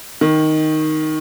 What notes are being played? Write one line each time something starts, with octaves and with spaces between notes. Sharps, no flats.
D#3